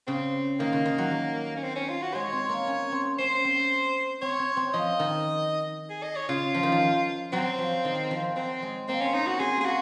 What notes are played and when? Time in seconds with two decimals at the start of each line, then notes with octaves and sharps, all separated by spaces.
0.07 C#3 C4
0.59 D#3 A#3
0.73 C#3
0.86 D#3
0.98 F#3
1.11 F#3
1.57 C#4
1.63 C4
1.76 C#4
1.89 F4
2.02 F#4
2.14 G#3 C#5
2.32 C4
2.49 A#3
2.67 C#4
2.92 C4
3.19 C#4 C5
3.45 C4
4.22 C4 C#5
4.39 C4
4.57 C4
4.74 F3 D#5
4.99 D#3
5.90 G#4
6.03 D#5
6.16 C#5
6.29 C#3 F4
6.54 F3
6.63 D#3
6.72 F3
7.33 F#3 C4
7.58 F3
7.85 D#3
8.11 F3
8.36 F#3 C4
8.62 G#3
8.88 A#3 C4
9.01 C4 C#4
9.14 D#4
9.22 C#4 F#4
9.40 C4 G#4
9.57 A#3 G#4
9.66 F#4